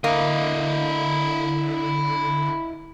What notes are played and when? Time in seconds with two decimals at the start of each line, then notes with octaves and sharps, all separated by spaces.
0.04 D3 A#3 E4 D#5